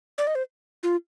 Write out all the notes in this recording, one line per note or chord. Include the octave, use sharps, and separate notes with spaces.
D5
D#5
C5
F4